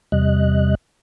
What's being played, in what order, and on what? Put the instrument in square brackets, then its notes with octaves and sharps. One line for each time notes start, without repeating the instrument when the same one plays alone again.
[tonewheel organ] E2 C3 G3 D#5 F#6